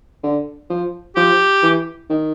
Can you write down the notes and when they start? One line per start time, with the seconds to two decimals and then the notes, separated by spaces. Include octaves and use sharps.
0.23 D3
0.70 F3
1.16 F3 G4
1.63 E3
2.09 D#3